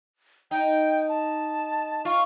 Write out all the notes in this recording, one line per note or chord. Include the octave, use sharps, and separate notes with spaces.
D#4 G5
A5
F4 C#6